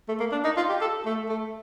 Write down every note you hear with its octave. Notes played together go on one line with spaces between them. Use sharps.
A3
A#3
D4
D#4
F4
G4
A4
A3
A3